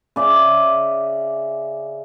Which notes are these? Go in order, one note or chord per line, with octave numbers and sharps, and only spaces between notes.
C#3 D5 E5